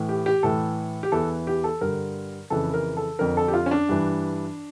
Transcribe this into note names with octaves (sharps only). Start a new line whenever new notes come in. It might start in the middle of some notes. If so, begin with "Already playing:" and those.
Already playing: A2 E3
G4
G4
A2 E3 A4
G4
E2 E3 A4
G4
A4
G2 D3 A#4
F2 C#3 E3 A4
A#4
A4
F2 D3 A#4
A4
G4
F4
C#4
D4
G2 E3